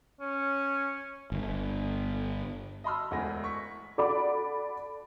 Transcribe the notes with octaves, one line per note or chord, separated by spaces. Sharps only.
C#4
G1
D#5 A5 B5 C6 E6 F6
E1 D2 G#3 E4 G#5 A#6
C#6 B6
A4 D5 F#5 B5 D6